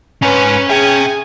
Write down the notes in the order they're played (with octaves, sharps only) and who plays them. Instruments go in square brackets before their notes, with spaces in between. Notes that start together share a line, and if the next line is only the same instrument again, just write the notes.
[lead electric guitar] G#2 [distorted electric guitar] C#4 C#5 [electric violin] B4
[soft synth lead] G#4 [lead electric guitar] E5 G5 [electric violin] G#5